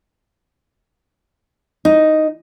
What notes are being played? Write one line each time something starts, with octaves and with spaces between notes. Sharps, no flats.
D#4